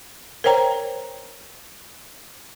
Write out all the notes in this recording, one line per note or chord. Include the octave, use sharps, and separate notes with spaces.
A#4 C5 C#5 G5 A#5